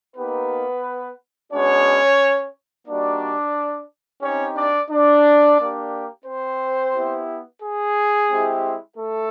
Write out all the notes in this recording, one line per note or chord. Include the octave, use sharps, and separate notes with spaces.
A#3 B3 D#4 G4 B4
G#3 B3 C#4 D4 F#4 C#5
G3 A#3 D4 D#4 F#4 D5
C4 C#4 D#4 G4 C#5
D4 D5
D4 D5
A#3 D4 G4
C4 C5
B3 E4 G4
G#4
G#3 C4 E4 G4
A3 A4